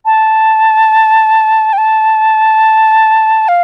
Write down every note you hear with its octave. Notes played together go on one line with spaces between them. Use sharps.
A5
G5
A5
F5